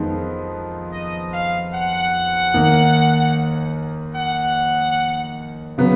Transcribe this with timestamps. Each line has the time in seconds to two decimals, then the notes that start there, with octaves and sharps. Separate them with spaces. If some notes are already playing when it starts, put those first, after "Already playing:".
Already playing: F2 D#3 G#3 B3 D#4
0.92 D#5
1.32 F5
1.73 F#5
2.54 D#2 D#3 A#3
4.15 F#5
5.78 C#3 F#3 B3